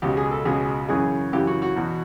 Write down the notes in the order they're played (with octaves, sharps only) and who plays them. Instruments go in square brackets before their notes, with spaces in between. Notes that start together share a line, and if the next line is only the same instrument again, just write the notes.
[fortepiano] C#2 B2 G4
G#4
A4
C#2 B2 G#4
F#2 C#3 E3 G#4
F#2 C#3 E3 G4
F#4
F#4
E2 B2